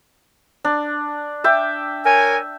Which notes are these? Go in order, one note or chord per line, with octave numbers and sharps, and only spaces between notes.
D4
E5 G5 D6
A#4 C#5 G#5